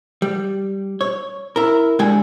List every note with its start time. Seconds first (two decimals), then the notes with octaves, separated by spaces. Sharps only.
0.22 G3
1.01 C#5
1.56 E4 A#4
1.99 G#2 D3 G3 G#3 G5 G#5